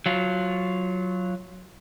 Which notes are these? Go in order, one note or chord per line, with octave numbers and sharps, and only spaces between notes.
F#3 F4